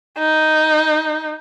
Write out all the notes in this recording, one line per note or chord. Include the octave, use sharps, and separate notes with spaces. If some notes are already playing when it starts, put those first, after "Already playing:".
D#4